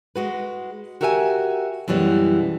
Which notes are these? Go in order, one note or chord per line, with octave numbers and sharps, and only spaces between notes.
G#3 F#4 B4
F#4 G4 A#4 E5 F5 G#5
F#2 B2 E3 G3 G#3